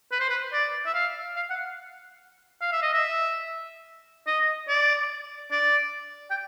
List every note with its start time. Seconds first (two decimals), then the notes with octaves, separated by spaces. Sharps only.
0.11 B4
0.20 C5
0.29 B4
0.53 D5
0.86 E5
0.94 F5
1.36 F5
1.50 F#5
2.61 F5
2.72 E5
2.82 D#5
2.93 E5
4.27 D#5
4.68 D5
5.51 D5
6.31 G5